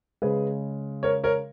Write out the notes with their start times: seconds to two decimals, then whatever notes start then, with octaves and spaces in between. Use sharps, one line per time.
0.22 C#3 G#3 G#4 B4
1.03 A#4 C#5
1.24 A#4 C#5